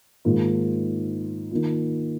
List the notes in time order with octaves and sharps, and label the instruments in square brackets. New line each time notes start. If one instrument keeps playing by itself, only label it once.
[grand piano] G#2 D#3 A#3 F4
D#3 A#3 F4